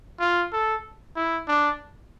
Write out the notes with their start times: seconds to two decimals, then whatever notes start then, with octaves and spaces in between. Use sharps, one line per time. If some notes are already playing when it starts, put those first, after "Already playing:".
0.20 F4
0.53 A4
1.16 E4
1.48 D4